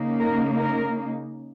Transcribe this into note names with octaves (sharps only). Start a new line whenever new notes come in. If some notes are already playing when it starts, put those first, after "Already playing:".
Already playing: C#3 A#3 D#4
A#4
A#4